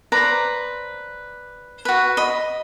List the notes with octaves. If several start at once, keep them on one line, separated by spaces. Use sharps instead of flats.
B4 C5 D5 A#5
F#4 B4
D#5 B5